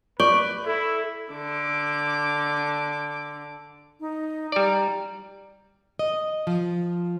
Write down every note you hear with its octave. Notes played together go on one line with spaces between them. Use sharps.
B4 D5 C#6 D6 G6
E4 A4
D3 D6
D#4
G3 D5 A#5
D#5
F3